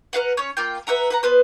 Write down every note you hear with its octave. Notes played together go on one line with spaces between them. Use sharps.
A#4 B4 F5 F#5
C#4 C#5
A#3 F4 G5
B4 E5 F#5 A#5
B4 F#5 A#5
B3 B4 C5